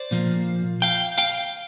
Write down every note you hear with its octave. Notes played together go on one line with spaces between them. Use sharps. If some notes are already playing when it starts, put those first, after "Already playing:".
Already playing: C5 D5
A#2 F3 A#3
F5 G5
F5 G5